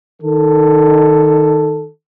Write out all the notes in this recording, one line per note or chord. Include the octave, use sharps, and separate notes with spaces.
D#3 A4